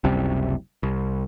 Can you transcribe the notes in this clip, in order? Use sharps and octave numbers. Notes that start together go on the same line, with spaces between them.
F#1 C#2 C3 G3
C2